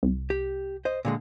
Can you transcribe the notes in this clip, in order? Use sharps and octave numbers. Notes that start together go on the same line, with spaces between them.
C2
G4
C5 D#5
A#2 D3 G#3